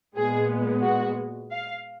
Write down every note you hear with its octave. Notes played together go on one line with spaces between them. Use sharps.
A#2 G#3 B3 G#4
F#4
F5